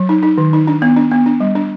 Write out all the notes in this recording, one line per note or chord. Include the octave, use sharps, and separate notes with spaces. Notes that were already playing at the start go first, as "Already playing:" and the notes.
Already playing: F#3
D#4
D#4
D#3
D#4
D4
B3
D4
B3
D4
G3
D4